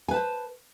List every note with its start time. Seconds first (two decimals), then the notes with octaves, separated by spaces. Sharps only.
0.08 G#5
0.11 B4
0.14 A5
0.16 C5